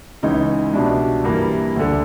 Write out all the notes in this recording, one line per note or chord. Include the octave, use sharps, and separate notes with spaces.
C#2 C#3 E3 D#4
C2 B2 D4
G2 E3 A#3
D2 D3